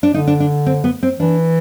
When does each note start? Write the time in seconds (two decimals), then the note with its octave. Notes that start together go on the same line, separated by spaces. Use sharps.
0.03 D4
0.14 D3 D#4
0.27 D4
0.40 D4
0.66 C4
0.84 B3
1.03 C4
1.19 E3 D4